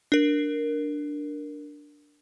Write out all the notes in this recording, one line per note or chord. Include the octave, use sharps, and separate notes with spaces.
D4 A#4